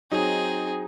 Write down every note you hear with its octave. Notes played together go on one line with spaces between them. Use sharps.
F#3 C4 D#4 G#4